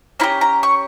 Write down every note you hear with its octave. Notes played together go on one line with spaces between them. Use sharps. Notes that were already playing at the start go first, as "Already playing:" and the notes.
C#4 E4 G4 A#5
A#5
C#6